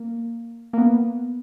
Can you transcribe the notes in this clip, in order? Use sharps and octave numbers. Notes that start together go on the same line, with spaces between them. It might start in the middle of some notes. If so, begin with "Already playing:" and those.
Already playing: A#3
A#3
B3